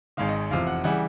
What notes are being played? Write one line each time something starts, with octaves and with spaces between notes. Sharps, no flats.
G#1 G#2 D#3 F5
D#5
F1 E2 C3 F3 F5
F#5
C#3 E3 G3 F#5